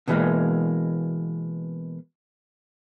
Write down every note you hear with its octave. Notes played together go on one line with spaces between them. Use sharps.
B2 D3 E3 G3 G#3 A#3